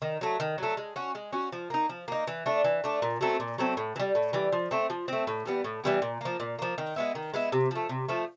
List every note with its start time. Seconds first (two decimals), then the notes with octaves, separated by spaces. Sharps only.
0.02 D#3
0.21 F#3 A3
0.40 D#3
0.58 F#3 A3
0.77 G#3
0.96 C#4 F#4
1.15 G#3
1.33 C#4 F#4
1.52 F3
1.70 A#3 D#4
1.89 F3
2.08 A#3 D#4
2.27 E3
2.46 A3 D4
2.64 E3
2.84 A3 D4
3.02 A#2
3.21 F#3 A3 C4
3.40 A#2
3.58 F#3 A3 C4
3.77 A2
3.96 E3
4.00 G3
4.15 A2
4.33 E3 G3
4.52 F3
4.71 A3 C4
4.90 F3
5.08 A3 C4
5.27 A2
5.45 E3 G3 B3
5.64 A2
5.84 E3 G3 B3
6.02 A#2
6.21 F3 A#3
6.40 A#2
6.59 F3 A#3
6.78 D#3
6.96 G#3 B3 E4
7.15 D#3
7.34 G#3 B3 E4
7.52 C3
7.71 F3 A3
7.89 C3
8.08 F3 A3